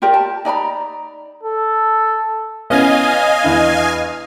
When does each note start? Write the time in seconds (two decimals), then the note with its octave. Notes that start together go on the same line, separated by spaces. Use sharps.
0.02 F4 G4 A#4 D5
0.14 A5
0.45 D#4 D5 A#5 B5
1.43 A4
2.70 B3 C#4 E4 D#5 F5 G#5
3.43 E2 D4 E4